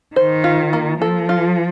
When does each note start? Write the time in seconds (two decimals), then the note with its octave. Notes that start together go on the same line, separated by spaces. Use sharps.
0.16 D#3 C5
0.44 F4
0.73 A#3
1.00 F3 A4
1.29 F4